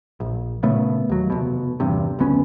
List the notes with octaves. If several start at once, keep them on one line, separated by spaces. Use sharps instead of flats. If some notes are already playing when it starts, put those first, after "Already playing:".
A#1
A#2 C#3 A3 B3
D#2 F#3
F1 B2
D#1 E2 G2 C3
F#1 D2 B3 C#4